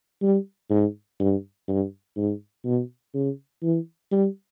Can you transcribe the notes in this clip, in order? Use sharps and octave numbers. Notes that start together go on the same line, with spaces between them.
G3
G#2
G2
G2
G#2
B2
C#3
E3
G3